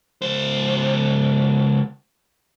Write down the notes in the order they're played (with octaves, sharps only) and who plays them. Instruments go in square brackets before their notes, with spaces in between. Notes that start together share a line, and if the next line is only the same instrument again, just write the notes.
[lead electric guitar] C#2 C5